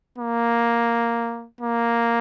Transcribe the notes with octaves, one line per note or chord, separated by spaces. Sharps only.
A#3
A#3